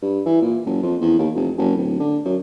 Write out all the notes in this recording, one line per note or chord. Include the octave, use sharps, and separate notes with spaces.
G2
E3
A#2
F#1
F2
E2
D#2
F1
F#1
D1
D3
F#2